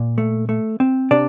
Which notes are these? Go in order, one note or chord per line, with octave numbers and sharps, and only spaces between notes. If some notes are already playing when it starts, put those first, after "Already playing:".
Already playing: A#2
A3
A3
C4
C3 D4 D5